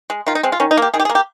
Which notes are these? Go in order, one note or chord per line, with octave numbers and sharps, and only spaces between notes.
G#3
D#3 F4
D#4
G#3 C4
F4
D#3 C#4
D#4
A#3 G4
D#3 G#4
G4
G#4
A#3
G4